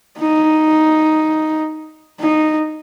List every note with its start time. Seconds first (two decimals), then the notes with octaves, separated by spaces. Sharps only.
0.18 D#4
2.20 D#4